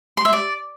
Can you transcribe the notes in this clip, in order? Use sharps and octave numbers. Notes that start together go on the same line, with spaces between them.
C6
E5
D5